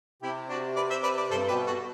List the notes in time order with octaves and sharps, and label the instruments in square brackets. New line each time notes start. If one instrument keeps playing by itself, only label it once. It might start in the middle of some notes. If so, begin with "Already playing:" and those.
[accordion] C3 [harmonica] E4 G4
[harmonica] D4 F#4
B4 D5
C5 E5
B4 D5
B4 D5
[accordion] G2 [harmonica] A4 C5
[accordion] B2 [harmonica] G4 B4
[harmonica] F#4 A4